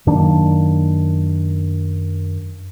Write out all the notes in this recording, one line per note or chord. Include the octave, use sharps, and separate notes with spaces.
F#2 D#3 A#3 D4